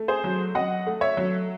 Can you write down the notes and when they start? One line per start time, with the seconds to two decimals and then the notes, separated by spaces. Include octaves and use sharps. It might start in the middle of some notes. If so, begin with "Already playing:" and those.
Already playing: A3
0.08 G#4 C5
0.24 F#3
0.55 F#3 D#5 F#5
0.87 A3
1.01 C#5 E5
1.17 F#3